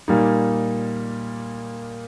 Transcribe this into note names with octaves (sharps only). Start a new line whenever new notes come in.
A#2 G3 A#3 D#4